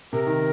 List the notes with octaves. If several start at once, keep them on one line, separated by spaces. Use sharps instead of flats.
C3 A#4
D#3